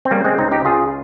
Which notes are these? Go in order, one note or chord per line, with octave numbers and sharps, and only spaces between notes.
C4
C#3 G3 A#3
G#3 C4
C#2 C4 D#4
D#4 G4
C#2 F4 G#4